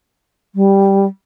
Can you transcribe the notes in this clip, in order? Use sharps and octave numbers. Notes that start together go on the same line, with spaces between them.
G3